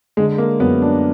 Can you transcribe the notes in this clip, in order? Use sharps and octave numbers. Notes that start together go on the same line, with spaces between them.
D3 G#3
A#3
F#2 B3
D4